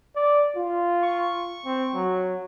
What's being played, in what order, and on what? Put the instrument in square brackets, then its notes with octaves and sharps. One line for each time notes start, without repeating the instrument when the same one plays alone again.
[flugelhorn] D5
F4
[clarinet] C#6
[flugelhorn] C4
F#3